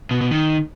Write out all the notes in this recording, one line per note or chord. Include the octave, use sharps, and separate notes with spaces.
B2
B2
D#3